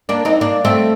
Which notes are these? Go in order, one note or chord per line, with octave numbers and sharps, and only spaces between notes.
A#3 D4
C4 D#4
A#3 D4
A3 C4